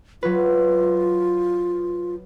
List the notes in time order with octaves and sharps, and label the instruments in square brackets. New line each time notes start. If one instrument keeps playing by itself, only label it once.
[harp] F#3 B4 [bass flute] F4